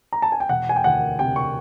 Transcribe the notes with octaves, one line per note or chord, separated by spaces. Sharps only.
A#5
A5
G#5
G5
E1 F#5
G#5
G5
D2 F#5
C3 G5
C#6